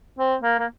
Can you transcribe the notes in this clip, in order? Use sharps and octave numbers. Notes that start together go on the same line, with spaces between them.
C4
A#3
A#3